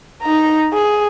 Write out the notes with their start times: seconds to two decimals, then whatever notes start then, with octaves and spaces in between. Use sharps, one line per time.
0.23 D#4 A#5
0.74 G#4